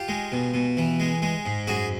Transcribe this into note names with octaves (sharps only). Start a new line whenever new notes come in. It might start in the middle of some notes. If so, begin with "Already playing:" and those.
Already playing: F4 G4
G#3
B2
B2
E3
G#3
G#3
G#2
F#2 F#4 G#4